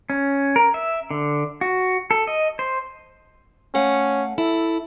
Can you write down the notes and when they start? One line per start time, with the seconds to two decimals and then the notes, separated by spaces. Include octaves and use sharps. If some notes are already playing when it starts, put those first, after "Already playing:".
0.10 C#4
0.56 A#4
0.74 E5
1.11 D3
1.61 F#4
2.11 A4
2.27 D#5
2.59 C5
3.75 A3 C#4 F5 F#5
4.38 E4 A4